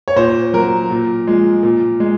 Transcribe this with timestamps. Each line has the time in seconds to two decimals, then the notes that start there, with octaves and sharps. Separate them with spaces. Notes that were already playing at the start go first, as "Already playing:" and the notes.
0.08 C#5
0.16 A#2 C5
0.53 F#3 A#4
0.90 A#2
1.27 F3 G#3
1.63 A#2
2.00 G#3